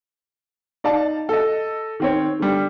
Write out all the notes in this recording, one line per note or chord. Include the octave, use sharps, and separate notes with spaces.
D#4 D5 F5 A5
A4 D#5
D#3 C4 C#5
D3 G3